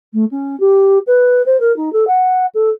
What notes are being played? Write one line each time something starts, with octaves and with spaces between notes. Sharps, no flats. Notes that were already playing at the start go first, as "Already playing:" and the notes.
A3
C#4
G4
B4
C5
A#4
D#4
A4
F#5
A4